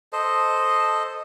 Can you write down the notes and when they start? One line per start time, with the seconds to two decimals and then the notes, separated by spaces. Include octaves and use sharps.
0.13 A4 C5 D#5